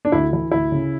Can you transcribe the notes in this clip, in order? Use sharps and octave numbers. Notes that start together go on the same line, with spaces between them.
D4
D2 E4
E3 E4
D2 E4
C#3